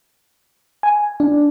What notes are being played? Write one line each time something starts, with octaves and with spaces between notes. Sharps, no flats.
G#5
D4